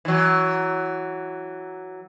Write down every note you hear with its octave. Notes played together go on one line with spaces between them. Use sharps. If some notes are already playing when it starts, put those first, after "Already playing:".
E3 F#3